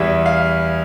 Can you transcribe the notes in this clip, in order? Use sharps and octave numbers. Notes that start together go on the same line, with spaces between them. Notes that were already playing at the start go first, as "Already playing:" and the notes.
Already playing: E2 E3 G3 E5
F5